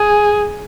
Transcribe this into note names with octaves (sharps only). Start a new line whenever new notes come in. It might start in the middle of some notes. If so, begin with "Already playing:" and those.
Already playing: G#4